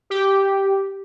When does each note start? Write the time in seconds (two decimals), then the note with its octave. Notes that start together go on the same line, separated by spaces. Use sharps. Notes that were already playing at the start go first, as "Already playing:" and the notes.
0.10 G4